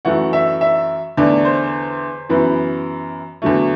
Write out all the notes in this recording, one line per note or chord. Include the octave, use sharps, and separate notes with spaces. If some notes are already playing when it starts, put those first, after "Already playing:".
F#2 E3 A3 F#5
E5
E5
E2 D3 A3 D5
C5
F#2 E3 B3
E2 D3 F#3 A3